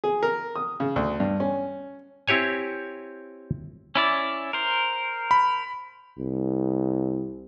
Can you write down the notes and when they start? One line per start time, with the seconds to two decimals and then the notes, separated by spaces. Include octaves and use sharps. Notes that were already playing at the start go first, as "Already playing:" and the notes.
0.04 G#4
0.23 A#4
0.56 D#6
0.80 C#3
0.96 D2
1.20 G2
1.40 C#4
2.28 C4 E4 G4 C#5 G#5
3.96 C#4 E4 D5
4.53 A#4 C5
5.31 B5
6.19 C2